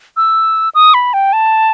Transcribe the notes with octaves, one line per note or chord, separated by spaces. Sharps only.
E6
D#6
B5
G5
A5